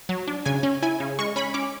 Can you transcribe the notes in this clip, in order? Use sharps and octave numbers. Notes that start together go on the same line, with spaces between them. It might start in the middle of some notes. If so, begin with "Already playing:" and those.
F#3
D4
C#3 G#5
C#4
E4 G#5
C#3
G#3 C#6
C#4 B5
C#4 D6